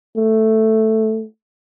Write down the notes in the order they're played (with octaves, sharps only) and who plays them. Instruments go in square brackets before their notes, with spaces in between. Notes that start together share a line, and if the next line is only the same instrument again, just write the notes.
[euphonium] A3